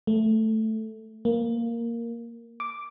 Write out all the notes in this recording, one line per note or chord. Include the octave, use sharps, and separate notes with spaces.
A3
A#3
D6